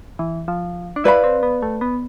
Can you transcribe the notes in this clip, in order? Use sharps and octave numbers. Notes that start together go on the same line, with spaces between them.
E3
F3
D4
E4 B4 D5 F5 B5
C4
B3
A3
B3